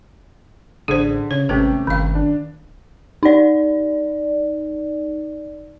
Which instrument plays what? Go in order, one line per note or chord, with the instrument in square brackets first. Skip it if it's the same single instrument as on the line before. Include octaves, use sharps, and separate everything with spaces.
[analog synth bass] A1 [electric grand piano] D3 [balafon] G#4 C5
[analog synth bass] C#3 [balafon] C#5
[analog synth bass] G#1 [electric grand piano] C3 A3 G4 [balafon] C#4 B4
[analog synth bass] G1 [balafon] D#3 F5
[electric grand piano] D4
[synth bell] D#4 D5